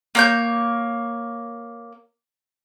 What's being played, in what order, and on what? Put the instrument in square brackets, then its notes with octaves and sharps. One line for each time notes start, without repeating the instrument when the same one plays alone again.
[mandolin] A#3 C#5 G6